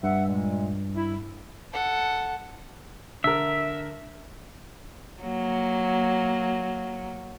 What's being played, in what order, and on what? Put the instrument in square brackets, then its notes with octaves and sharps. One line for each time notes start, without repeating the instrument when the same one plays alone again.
[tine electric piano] G2 [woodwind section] E5 F#5
[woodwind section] A#2 G#3
E4
[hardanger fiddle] A4 F#5
[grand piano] D3 A#4 [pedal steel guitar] E5
[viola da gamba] F#3 A#3